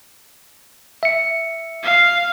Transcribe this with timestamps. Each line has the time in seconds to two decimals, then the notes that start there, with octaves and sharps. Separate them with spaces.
1.03 E5 C#7
1.83 F5